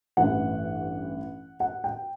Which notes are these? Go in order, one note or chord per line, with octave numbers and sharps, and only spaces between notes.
A1 G2 E3 F#5
F#5
G5